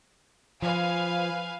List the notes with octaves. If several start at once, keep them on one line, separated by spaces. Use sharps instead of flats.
F3 B4 F5 G#5